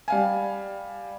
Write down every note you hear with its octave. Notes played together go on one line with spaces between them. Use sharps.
G3 F5 G#5